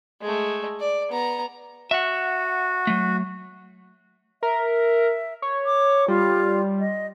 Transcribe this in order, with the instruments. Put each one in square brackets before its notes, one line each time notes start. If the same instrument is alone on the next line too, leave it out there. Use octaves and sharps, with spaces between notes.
[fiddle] G#3 A3
D5
B3 A#5
[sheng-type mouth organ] F#4 [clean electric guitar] E5 F#5
[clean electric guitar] F#3 A3
[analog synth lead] A#4 [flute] E5
[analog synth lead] C#5
[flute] D6
[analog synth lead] G3 [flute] F4
[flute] D#5